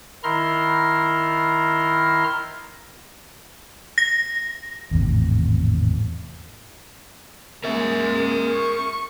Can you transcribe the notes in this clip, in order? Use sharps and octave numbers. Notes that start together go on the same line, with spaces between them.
D#3 E4 A#5 C6 F6
A#6
G#1 E2 A2 C3
G#3 A#3 A#4 E5
C#6